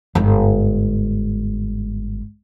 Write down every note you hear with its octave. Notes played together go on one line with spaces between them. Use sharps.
G1 G#2